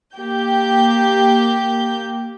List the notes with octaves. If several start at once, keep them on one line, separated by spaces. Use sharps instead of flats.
A#3 G4 G6